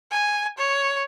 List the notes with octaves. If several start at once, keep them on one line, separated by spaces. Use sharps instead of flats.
G#5
C#5